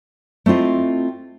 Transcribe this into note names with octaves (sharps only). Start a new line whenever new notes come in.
A3 C4 E4 F4 D#5